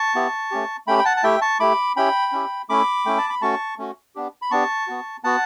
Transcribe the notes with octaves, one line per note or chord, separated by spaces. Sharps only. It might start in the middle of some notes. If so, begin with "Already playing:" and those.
Already playing: A5 C#6
B3 E4 G4
A3 C#4 G4
A3 C#4 G4 G5 B5
G5
F#5 A5
A5
A3 E4 G4 E5 G5
A5 C#6
A3 E4 G4 B5 D6
C#4 E4 G4 G5 B5
C#4 E4 G4
A3 C#4 E4 B5 D6
A3 C#4 E4 G5
A5
B5
A3 C#4 F#4 A5 C#6
A3 C#4 F#4
B3 D4 G4
B5
B3 D4 G4 A5 C#6
B3 F#4
B3 F#4 F#5 A5